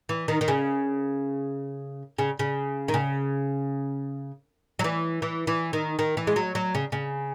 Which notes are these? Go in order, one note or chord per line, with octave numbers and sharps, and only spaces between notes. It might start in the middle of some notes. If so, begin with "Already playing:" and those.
E3
D#3
D#3
C#3
C#3
C#3
D#3
C#3
F#3
E3
E3
E3
D#3
D#3
E3
G#3
F#3
F#3
C#3
C#3